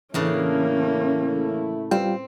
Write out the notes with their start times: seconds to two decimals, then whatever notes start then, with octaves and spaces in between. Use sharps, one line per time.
0.14 A2 C#3 E3 A3 A#3 C#4 D4 E4
1.91 G3 C4 F4 G5